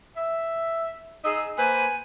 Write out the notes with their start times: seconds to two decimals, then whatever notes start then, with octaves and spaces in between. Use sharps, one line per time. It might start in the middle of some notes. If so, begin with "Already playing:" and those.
0.17 E5
1.25 D#4 G#4 D#5 E6
1.57 A#3 B4 C5 G#5